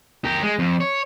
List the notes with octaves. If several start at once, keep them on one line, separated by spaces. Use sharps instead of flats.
G4 A#4
G#3
F2
C#5